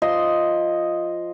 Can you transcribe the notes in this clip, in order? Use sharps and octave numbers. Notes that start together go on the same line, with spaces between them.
F3 D#5 C6